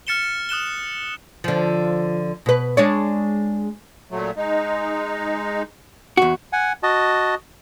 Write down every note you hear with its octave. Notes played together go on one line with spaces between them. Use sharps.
F6 A6 C#7 E7 G7
D#6 F#6 E7 G7
D3 F3
B2 B4
G#3 D4 C#5
A#2 F#3 A3
G#3 D#4
E2 F#4
F#5 G#5
F#4 D#5 A5